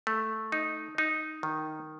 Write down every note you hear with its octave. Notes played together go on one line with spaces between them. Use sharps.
A3
D#4
D#4
D#3